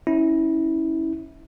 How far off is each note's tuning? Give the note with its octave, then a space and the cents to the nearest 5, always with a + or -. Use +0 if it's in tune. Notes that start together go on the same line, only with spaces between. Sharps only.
C#4 +0 E4 -20